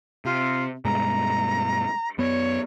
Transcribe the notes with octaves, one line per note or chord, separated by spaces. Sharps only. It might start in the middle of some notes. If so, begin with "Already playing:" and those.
C3 F4
G2 B2 G#3 A#5
F#2 B3 C#5